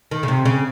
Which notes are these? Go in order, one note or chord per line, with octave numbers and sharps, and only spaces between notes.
D#3
C#3
C3
C#3